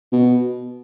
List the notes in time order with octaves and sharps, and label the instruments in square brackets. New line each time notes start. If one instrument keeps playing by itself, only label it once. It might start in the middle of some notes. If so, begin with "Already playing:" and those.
[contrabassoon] B2